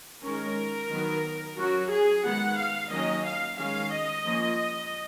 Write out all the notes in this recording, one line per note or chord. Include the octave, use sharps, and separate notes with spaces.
D#3 G#3 C#4 A#4
D#3 F#3 B3
F#3 C#4 F#4
G#4
D#3 G#3 B3 F#5
F5
D#3 F#3 A#3 C#4 D#5
F5
D#3 G#3 C#4 F5
D#5
F3 A#3 C#4